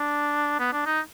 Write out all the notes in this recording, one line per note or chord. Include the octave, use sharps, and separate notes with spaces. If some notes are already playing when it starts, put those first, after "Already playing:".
Already playing: D4
B3
D4
D#4